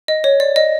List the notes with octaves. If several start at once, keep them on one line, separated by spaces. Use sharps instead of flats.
D#5
C#5
D5
D#5